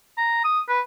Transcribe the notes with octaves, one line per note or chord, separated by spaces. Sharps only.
A#5
D#6
B4